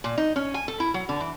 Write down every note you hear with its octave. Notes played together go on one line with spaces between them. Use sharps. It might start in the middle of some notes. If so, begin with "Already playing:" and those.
A#2
D#4
C#4
G#5
A4
E4
F#3
D3
E3